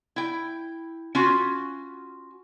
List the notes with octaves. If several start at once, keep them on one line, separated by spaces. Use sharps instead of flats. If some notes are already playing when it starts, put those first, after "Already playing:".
E4 G5
C#4 F4 F#4